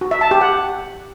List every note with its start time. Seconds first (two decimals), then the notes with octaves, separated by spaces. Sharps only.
0.01 F#4
0.11 E5
0.21 A5
0.31 G4
0.41 F#5